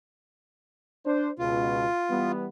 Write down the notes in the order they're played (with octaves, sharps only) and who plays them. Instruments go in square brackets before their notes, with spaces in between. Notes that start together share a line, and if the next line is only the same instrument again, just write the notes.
[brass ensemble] D4 C5
[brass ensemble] C#2 B2 [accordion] F4
[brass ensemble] E3 G3 B3